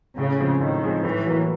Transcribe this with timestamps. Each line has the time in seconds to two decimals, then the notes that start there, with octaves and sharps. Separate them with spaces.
0.18 A2 C#3
0.40 F3 G#3 C4
0.61 A2 D#3
0.83 F3 G#3 C4
1.05 A2 E3
1.26 F#3 A#3